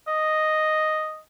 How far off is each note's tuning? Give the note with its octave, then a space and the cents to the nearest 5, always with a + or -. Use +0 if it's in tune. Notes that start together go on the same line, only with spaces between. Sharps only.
D#5 +0